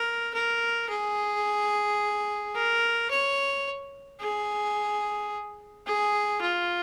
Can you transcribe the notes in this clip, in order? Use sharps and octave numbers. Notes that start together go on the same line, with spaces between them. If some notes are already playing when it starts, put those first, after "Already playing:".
Already playing: A#4
A#4
G#4
A#4
C#5
G#4
G#4
F4